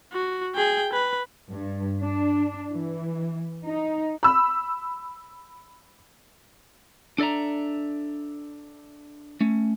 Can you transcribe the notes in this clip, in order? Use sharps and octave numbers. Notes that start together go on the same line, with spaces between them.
F#4
G#4 G5
B4
G2
D4
E3
D#4
B5 E6
D4 A4 D5 E5 A#5
A3 C#4